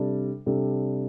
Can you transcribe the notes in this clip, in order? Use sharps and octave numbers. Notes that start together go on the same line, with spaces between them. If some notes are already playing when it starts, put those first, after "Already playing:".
Already playing: C3 G3 D4 A4
C3 G3 D4 A4